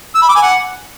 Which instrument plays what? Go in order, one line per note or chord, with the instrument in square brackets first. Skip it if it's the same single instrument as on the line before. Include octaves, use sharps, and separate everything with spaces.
[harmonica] E6
B5
D6
G#5
F#5